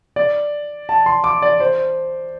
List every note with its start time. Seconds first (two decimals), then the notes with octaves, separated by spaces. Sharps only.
0.16 D5
0.89 A5
1.06 C6
1.24 D6
1.42 D5
1.60 C5